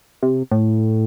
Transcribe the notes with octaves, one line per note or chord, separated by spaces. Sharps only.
C3
A2